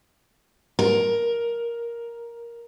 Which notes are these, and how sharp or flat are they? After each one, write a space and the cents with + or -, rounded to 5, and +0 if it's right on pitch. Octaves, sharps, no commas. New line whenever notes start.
A#4 +10